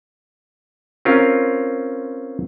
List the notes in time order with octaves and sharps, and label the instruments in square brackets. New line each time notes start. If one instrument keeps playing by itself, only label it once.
[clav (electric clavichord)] C4 C#4 F4 A#4